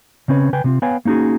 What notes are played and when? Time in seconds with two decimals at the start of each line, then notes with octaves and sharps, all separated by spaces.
0.28 C#3 C4 C#4 B4 C#5
0.53 C#3 B4 G5 G#5
0.64 C3 C4 F4
0.82 B3 B4 C#5 F5 G5 G#5
1.05 A#3 C#4 D#4 F#4 G#4